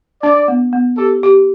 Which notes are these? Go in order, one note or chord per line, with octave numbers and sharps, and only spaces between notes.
D4 D5
B3
B3
G4 A4
G4